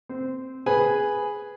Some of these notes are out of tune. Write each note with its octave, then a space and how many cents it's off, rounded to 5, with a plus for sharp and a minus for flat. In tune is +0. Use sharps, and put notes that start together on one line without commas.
C4 +0 C5 -15
G#4 +0 B4 +0 G#5 +0